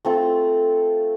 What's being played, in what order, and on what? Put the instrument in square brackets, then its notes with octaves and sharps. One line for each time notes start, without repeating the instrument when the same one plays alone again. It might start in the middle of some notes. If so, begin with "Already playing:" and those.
[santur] A3 C4 F4 A4